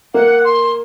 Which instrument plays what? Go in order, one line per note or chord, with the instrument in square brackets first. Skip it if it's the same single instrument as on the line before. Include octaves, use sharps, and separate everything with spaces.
[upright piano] A#3 [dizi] F#5
[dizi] C6